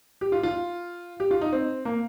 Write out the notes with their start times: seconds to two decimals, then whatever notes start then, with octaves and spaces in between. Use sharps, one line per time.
0.21 G4
0.32 F4
0.43 F4
1.20 G4
1.31 F4
1.41 D#4
1.53 C4
1.85 A#3